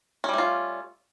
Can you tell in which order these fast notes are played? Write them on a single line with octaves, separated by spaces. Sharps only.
C#4 G3 A3 F4